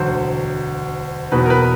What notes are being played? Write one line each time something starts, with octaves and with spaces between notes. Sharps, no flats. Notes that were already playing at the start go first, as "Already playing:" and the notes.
Already playing: E1 D2 D3 F#3 C5
E2 B2 F#3 B4
A#4
B4